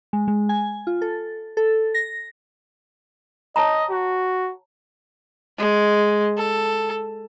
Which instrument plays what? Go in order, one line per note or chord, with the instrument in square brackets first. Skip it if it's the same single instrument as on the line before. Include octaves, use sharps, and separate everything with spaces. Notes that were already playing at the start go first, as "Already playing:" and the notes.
[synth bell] G#3
G#3
G#5
F4
A4
A4
A#6
[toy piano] C#5 A5 A#5 [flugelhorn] D#5
[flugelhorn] F#4
[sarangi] G#3
A4